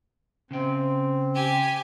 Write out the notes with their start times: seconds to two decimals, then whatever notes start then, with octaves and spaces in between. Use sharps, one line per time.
0.51 C#3 C4 G5
1.35 G4 G#5